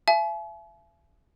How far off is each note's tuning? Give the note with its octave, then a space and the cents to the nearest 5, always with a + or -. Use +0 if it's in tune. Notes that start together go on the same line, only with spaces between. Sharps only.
E5 +40 G#5 +45